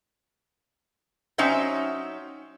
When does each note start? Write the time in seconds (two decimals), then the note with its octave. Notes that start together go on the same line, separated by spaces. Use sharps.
1.38 F#3 C#4 D#4 C5 E5 G5